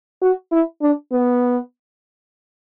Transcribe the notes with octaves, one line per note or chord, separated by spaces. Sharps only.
F#4
E4
D4
B3